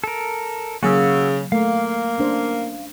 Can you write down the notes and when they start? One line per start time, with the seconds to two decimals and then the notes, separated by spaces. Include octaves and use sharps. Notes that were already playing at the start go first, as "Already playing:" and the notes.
0.04 A4 A#4
0.83 C#3 F#3 A#3 F#4 E6
1.52 A3 A#3 F5
2.18 C#4 D4 C5